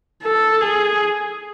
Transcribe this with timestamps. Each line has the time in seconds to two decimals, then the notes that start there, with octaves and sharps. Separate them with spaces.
0.23 A4
0.61 G#4